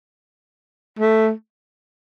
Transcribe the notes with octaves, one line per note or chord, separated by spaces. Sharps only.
A3